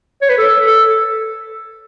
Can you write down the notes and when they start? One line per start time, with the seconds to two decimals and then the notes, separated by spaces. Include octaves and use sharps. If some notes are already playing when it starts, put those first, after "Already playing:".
0.22 C#5
0.29 B4
0.38 A4
0.65 A4